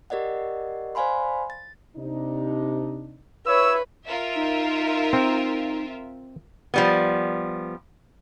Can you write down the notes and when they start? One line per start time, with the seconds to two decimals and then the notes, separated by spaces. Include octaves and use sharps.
0.10 G4 A#4 D5 D#5 F#5
0.95 C5 D5 F5 G#5 B5 C6
1.50 A6
1.96 C3 D4 D#4
3.46 E4 B4 C#5 E6
4.06 F4 A#4 E5
4.36 D#4
5.13 C4
6.74 F3 G3 B3